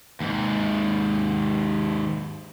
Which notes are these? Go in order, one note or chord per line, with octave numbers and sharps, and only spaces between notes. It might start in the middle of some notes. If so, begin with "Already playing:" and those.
D#2 G#2